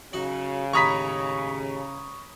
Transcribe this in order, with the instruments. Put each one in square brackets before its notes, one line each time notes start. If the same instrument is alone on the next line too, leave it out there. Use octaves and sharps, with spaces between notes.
[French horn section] C#3 [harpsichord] F#3 D#4 F#4
[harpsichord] D#2 A2 [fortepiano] C#5 A#5 B5 [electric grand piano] C#6 D#6 B6